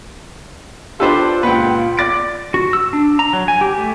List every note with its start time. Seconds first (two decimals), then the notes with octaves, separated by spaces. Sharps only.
1.00 D4 F4 G4 A4 B4 C5
1.43 C#2 A#2 B4 F#5 G5
1.97 D5 A6 D7
2.54 F#4
2.73 E6
2.93 D4
3.19 A#5
3.33 F#3
3.48 G#5
3.61 G4
3.78 A3